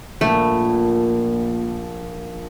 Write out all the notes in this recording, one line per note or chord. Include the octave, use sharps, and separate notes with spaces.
A#1 A#2 A3